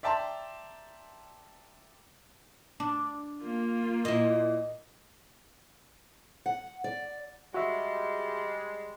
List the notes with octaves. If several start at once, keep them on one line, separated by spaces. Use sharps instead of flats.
D5 E5 G5 A5 A#5 C6
D4
A#3 F4
A#2 E4 D#5
F#5
D5
G3 G#3 F#4 E5